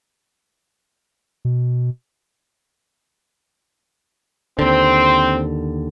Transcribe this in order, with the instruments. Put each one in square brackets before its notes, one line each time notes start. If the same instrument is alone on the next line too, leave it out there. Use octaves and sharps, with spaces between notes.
[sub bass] B2
[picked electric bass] D#2 D3 [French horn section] C4